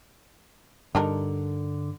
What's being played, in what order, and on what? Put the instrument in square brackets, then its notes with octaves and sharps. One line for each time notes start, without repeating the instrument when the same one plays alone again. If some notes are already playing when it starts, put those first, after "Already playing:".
[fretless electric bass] G2 G3 [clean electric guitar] D3 [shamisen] D4 D#4 A#4